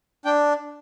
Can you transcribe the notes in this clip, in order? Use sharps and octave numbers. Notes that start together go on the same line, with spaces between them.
D4 G5